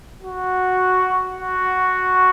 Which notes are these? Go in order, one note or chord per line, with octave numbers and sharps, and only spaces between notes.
F#4
F#4